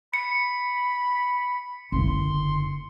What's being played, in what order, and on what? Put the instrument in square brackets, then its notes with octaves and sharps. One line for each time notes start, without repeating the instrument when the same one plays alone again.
[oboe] B5 [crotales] C#7
[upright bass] F#1 D3 [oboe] C6